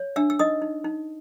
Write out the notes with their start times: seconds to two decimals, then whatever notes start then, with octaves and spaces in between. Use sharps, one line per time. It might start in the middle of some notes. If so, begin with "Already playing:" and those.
Already playing: C#5
0.16 D4 E5 E6
0.30 E6
0.39 D#4 D#5 D#6
0.62 D#4
0.84 D#4